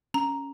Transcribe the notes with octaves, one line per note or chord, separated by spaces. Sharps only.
C#4 A#5